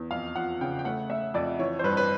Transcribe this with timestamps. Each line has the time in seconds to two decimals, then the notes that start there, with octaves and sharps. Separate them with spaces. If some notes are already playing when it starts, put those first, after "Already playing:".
Already playing: E2
0.11 F2 F5
0.36 F3 F#5
0.61 C#3 G5
0.79 G5
0.85 A3 F#5
1.10 A3 E5
1.34 F2 D5
1.59 E3 C#5
1.79 C5
1.84 G2 B4
1.97 B4